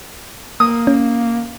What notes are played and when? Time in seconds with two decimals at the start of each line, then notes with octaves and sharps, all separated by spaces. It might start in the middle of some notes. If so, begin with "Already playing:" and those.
0.60 A#3 D#6
0.87 C#4